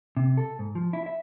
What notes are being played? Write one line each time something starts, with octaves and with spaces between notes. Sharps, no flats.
C3
A4
G#2
F3
E4
E5